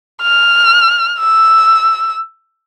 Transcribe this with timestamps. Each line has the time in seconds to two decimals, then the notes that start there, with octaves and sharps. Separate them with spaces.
0.22 F6
1.20 E6